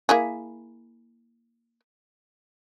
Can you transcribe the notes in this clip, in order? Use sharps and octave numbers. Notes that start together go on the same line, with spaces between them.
A#3 E4 G#4